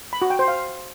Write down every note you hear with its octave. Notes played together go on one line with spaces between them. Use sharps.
B5
F#4
G5
C5
F5